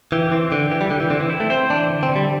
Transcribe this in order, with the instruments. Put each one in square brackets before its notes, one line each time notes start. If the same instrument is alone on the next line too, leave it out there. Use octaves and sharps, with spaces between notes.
[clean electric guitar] E3 [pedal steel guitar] G4
[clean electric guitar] E3 [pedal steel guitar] C4
[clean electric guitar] D3 [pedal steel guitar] G4
[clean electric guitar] E3 [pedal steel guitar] G4
[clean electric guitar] G3
[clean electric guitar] D3 [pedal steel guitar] G4
[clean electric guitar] E3
[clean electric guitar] D3 [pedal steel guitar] C4
[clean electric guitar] E3
[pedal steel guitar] E4
[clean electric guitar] A3
[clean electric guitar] C4 [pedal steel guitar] C5
[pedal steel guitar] E3 [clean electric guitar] D4
[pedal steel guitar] D3
[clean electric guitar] C4
[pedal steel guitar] D3
[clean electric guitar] G3